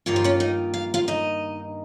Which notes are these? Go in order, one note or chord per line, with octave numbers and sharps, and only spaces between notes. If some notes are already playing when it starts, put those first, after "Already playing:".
G2 D#3 A#3 F4 C#5
C5
C#4 C#5
D#4 D#5
F5
F4 F5
D#4 D#5